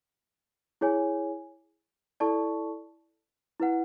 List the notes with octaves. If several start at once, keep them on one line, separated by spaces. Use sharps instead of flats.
E4 G#4 C#5 G#5
E4 A4 D5 A5 C#6
E4 B4 F#5